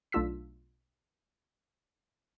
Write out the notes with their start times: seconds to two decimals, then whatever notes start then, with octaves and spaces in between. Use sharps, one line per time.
0.12 B1 A3 D4 F4 E6 B6